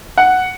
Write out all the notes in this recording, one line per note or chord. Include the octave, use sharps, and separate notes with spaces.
F#5